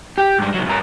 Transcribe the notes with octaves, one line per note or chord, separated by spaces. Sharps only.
G4
G#2 G3
C2 F#3
G2 A#4